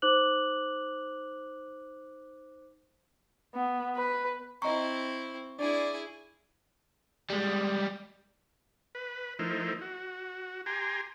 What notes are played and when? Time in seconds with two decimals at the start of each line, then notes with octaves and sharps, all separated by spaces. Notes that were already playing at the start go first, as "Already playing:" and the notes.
0.02 D#4 C5 D6 F#6 F#7
3.54 B3
3.96 B4
4.62 C4 E4 D#5 A#5 C#6
5.59 D4 E4 G#4 D5
7.30 G3 G#3
8.95 B4
9.39 F3 A3 D#4 E4 A#4 C5
9.81 F#4
10.66 G4 G#5 A#5 C6